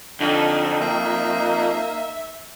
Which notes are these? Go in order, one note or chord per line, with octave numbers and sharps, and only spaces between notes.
F2 D3 D#4
A#3 E5